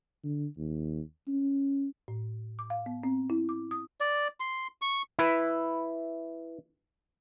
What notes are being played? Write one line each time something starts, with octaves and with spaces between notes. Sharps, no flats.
D3
D#2
C#4
A2
D6
F5
B3
C4
E4
D6
D#6
D5
C6
C#6
E4 B4